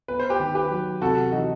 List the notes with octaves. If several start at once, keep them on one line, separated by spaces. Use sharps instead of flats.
B3 B4
C5
G4 B4
D#3
G4 B4
F#3
C3 F#4 A4
E3 D#4 F#4